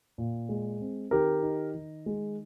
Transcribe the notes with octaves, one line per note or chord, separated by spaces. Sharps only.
A#2
G#3
C4
D#3 G4 A#4
D#4
D#3
G#3